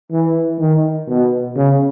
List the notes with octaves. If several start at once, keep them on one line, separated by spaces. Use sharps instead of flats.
E3
D#3
B2
C#3